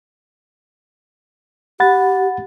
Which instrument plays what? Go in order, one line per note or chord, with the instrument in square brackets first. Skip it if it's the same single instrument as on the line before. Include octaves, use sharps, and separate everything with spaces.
[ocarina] G4 [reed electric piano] F#5 B5 A6